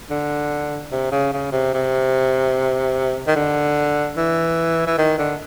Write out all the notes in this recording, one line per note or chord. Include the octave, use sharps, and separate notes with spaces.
D3
C3
C#3
C#3
C3
C3
D#3
D3
E3
E3
D#3
D3